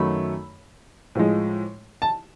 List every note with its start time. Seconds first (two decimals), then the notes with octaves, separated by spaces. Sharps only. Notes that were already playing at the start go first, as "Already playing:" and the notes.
Already playing: F#2 D#3 F#3 A3 B5
1.15 A2 F3 G#3
2.02 A5